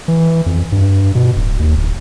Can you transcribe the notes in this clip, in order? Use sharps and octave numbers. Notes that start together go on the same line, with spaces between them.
E3
F2
G2
B2
D1
D#2
D1